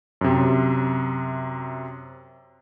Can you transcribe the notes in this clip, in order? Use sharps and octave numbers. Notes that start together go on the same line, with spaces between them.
F#2 C3